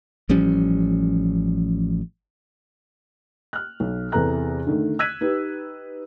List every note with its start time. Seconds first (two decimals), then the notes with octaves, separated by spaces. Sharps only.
0.29 A1 F3 G3 C#4
3.53 F6 F#6
3.80 B1
4.12 E2 C3 A4 B4 A#5 F#6
4.67 D3 D#3 A3
4.99 E6 F#6 G#6 B6 D#7
5.21 D#4 G4 B4